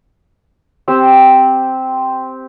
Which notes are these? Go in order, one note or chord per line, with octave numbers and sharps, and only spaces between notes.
C4 G4 E6